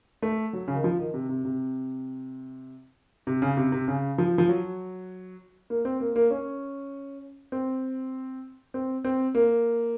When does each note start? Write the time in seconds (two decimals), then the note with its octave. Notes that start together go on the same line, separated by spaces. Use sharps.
0.22 A3
0.53 F#3
0.68 C#3
0.75 D#3
0.84 F3
0.99 D#3
1.14 C3
1.29 C3
1.45 C3
3.27 C3
3.42 C#3
3.57 C3
3.72 C3
3.88 C#3
4.18 F3
4.38 F3
4.49 F#3
5.70 A#3
5.85 C4
6.01 A#3
6.16 A#3
6.31 C#4
7.52 C4
8.74 C4
9.05 C4
9.35 A#3